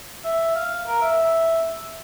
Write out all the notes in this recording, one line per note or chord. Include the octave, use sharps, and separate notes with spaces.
E5
F5
A#4
E5